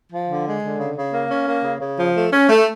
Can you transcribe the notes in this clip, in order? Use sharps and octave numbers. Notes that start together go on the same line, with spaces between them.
F3
D3
G#3
D3
C#3
C#3
A#3
C#4
A#3
C#3
C#3
F3
A3
C#4
A3